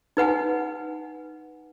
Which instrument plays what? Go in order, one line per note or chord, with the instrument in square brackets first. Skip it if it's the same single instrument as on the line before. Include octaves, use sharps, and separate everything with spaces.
[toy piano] D#4 B4 F#5 G#5